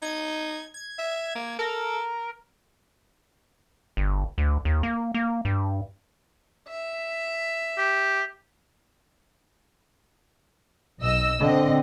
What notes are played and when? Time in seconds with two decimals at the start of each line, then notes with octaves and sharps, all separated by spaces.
0.02 D#4 G#6
0.74 G#6
0.98 E5
1.35 A#3
1.59 A4 A#4
3.97 G1
4.38 D2
4.65 D#2
4.83 A#3
5.14 A#3
5.45 G2
6.66 E5
7.78 G4
11.00 B1 D#5 E6
11.40 D3 C4 D#5